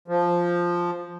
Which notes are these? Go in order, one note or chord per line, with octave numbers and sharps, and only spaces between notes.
F3